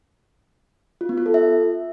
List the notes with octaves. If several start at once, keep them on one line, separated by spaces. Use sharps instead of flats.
F4
B3
F4
A4
E5